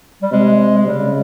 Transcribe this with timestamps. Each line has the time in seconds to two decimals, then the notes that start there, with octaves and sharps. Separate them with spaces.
0.22 G3
0.32 C3 G#3
0.77 G#3
0.87 C#3 G3